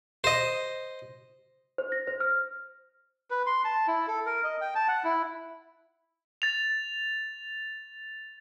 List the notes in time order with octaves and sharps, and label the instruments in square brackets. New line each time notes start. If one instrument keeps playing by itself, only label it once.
[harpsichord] C5 D#5
[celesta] C5
A#6
C5
F6
[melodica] B4
C6
A5
E4
A4
A#4
D#5
G5
A5
F#5
E4
[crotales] A6 F7